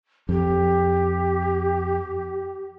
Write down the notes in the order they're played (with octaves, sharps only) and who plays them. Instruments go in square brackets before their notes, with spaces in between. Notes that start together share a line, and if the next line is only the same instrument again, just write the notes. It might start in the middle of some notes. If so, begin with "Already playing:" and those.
[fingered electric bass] F2 [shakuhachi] G4